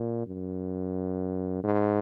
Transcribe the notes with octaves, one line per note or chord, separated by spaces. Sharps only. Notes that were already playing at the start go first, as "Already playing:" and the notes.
Already playing: A#2
F#2
G#2